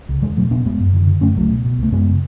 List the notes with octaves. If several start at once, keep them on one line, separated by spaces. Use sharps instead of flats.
C#2
E2 E3 G#3
B2 F#3 A3
B2 B3 D4
E2 G#3 B3
F#2
D3
D3
F#2 A3 C#4
C#2 F#3 A3
B2
B2
C#2 A3
F#2 G#3 B3
C#3